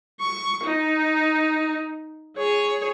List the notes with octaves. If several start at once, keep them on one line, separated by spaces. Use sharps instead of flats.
C#6
D#4
G#4 C#5